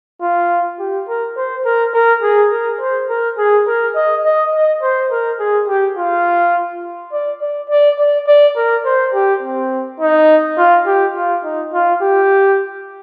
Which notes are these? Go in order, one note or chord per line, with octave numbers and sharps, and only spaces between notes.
F4
G4
A#4
C5
A#4
A#4
G#4
A#4
C5
A#4
G#4
A#4
D#5
D#5
D#5
C5
A#4
G#4
G4
F4
D5
D5
D5
D5
D5
A#4
C5
G4
C4
D#4
F4
G4
F4
D#4
F4
G4